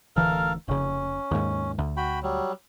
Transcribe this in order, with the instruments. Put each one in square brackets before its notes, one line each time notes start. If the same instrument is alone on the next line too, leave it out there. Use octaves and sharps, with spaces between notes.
[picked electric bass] D1 D2 E3 [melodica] A4 A#4 F5
[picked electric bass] F1 C#3 [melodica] C#4
[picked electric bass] D#2 G#2
D2
[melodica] F#4 G5 B5
F#3 G3